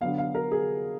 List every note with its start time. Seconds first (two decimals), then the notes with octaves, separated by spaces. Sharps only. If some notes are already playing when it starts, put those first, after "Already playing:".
0.01 D3 F#3 B3 F5
0.18 F5
0.35 A#4
0.52 G#4